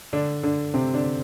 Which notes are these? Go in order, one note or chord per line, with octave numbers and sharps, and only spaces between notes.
D3 D4
D3 D4
C3 C4
D3 D4